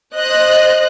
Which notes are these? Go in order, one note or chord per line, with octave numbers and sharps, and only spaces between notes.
C5 D#5 F#6